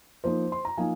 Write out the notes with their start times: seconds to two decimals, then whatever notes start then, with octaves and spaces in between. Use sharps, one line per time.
0.24 F3 A#3 D#4 C5
0.52 C6
0.65 A#5
0.77 F3 A#3 D#4 F5 G#5